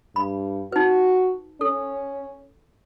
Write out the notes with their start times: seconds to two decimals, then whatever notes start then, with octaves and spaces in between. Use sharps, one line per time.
0.16 G2 B5
0.72 D#4 F#4 B4
1.61 C#4 A4